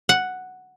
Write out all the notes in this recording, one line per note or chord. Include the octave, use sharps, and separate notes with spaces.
F#5